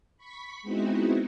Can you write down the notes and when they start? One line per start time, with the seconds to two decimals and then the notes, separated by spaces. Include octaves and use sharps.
0.17 B5 C#6 B6
0.62 G#3 B3 C4 D#4 E4 F#4